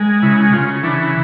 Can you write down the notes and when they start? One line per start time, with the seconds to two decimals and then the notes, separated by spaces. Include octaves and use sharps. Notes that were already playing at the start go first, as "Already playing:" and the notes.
Already playing: G#3
0.22 C#3 E4
0.52 C#3 F4
0.83 E3 D4